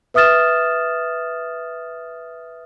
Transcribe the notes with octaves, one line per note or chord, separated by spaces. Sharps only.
B4 E5 D#6 F6 A6 E7